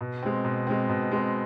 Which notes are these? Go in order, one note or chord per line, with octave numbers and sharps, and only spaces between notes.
B2
G#3 C4
B2
G#3 C4
B2
G#3 C4